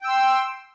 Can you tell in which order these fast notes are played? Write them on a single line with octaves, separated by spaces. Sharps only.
G5 E6 C6